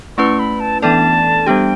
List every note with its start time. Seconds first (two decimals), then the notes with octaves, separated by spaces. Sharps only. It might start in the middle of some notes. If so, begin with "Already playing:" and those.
0.18 A3 C#4 E4 B4 C#6
0.39 B5
0.60 A5
0.82 E3 B3 D4 A4 D5 A5
1.46 G3 B3 D4 G4 G5